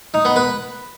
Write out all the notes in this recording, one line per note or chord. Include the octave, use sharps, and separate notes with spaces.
D#4
B3
B4